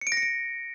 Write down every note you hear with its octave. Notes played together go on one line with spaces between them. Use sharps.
C#7
D7
A#6
C#7
D7